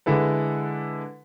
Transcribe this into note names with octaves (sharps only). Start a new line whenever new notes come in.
D3 G#3 E4 A4 B4